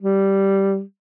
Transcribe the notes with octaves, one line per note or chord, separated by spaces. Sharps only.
G3